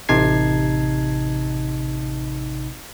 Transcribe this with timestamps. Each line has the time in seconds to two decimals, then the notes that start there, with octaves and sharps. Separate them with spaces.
0.09 A1 C3 D#4 A5 G#6 C7